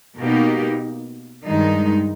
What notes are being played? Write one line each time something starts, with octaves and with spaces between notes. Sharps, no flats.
B2 A#3 D#4 G4
G2 D#3 G#3 D#4